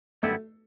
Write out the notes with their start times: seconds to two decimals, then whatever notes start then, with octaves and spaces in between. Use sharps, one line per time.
0.23 F#2 D3 G3 A3 B3 E4